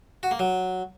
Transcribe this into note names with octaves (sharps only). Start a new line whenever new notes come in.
F#4
A#3
F#3